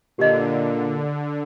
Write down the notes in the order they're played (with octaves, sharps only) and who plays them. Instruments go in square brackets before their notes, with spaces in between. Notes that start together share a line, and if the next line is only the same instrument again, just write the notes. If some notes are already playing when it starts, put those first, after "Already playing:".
[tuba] A#2 [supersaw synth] D3 [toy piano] G4 D#5